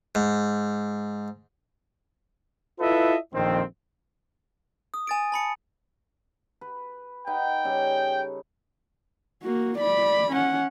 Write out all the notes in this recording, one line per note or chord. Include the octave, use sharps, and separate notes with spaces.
G#2
E4 F4 A4 B4 D#5 E5
A#1 F2 D#3 C4
D#6
G#5 A6 D7
A5 B5 C#7
B4
D#4 B4 F#5 G5
C#3 G3 A4
A#3 F#4
D5 B5
C#4 F#5